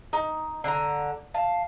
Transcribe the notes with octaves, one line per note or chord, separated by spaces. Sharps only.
D#4
D3 A#5
F5 A5